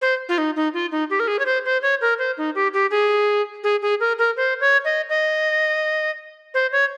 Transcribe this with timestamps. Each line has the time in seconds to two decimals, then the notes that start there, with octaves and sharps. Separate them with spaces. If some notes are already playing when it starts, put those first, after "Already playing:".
0.02 C5
0.29 F4
0.38 D#4
0.56 D#4
0.74 F4
0.92 D#4
1.10 G4
1.20 A#4
1.28 G#4
1.39 C#5
1.46 C5
1.65 C5
1.82 C#5
2.01 A#4
2.19 C5
2.38 D#4
2.55 G4
2.74 G4
2.91 G#4
3.64 G#4
3.82 G#4
4.00 A#4
4.18 A#4
4.37 C5
4.61 C#5
4.85 D#5
5.09 D#5
6.54 C5
6.72 C#5